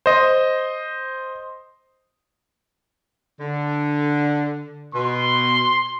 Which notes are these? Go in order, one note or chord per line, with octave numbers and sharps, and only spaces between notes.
C5 D#5
D3
B2 C6